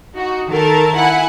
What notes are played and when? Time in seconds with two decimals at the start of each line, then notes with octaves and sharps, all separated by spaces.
0.14 D#4 F#4
0.49 D#3 A4 A#4 A5
0.94 E4 F#5 G#5